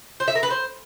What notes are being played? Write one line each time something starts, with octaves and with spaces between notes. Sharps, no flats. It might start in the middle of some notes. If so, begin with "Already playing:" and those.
C5
E5
A#4
B4
C5